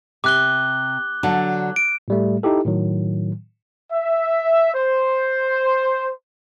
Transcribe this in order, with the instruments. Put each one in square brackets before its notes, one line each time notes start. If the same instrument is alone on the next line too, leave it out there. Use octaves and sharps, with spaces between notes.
[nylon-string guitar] C3 [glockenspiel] D6 F#6 G7
[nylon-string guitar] D3 F#3 D4
[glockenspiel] D7
[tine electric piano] A2 G3 A3
D#4 E4 G4 A4
A2 D#3 F#3
[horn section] E5
C5